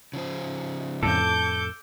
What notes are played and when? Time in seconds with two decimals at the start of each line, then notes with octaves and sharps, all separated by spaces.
0.13 C#3 F3 C5
1.03 F2 A2 A4 D6 G6